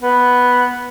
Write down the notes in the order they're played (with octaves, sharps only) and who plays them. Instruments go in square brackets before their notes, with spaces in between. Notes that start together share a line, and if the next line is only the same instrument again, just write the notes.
[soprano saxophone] B3